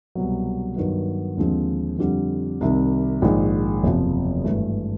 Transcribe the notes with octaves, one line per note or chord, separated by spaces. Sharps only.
C2 B2 F#3
G2 D#3 F#3 B3
D#2 D3 F3 G#3 C4
F2 D3 G3
C2 C3 D#3
A#1 G#2 D#3
F#1 E2 C3 F3
G#1 G2 E3 A3